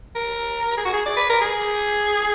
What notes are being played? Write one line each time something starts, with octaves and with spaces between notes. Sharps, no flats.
A#4
G#4
F#4
G#4
D5
B4
A#4
G#4